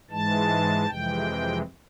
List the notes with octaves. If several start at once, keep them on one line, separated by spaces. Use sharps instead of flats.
G#2 E3 G#3 A5
F2 C3 E3 G#3 G5